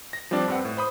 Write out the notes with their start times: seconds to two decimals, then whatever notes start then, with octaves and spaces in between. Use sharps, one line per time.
0.13 A#6
0.31 F3 G3 C4 D4 D5
0.48 G2 C4 F#5
0.65 A2
0.77 C5 B5 D#6